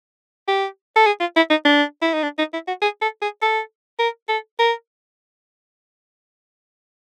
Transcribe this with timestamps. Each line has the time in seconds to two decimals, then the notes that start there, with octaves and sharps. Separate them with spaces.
0.48 G4
0.96 A4
1.06 G#4
1.20 F4
1.36 E4
1.50 D#4
1.65 D4
2.02 E4
2.13 D#4
2.23 D4
2.38 D#4
2.53 E4
2.68 F#4
2.82 G#4
3.01 A4
3.22 G#4
3.42 A4
3.99 A#4
4.29 A4
4.59 A#4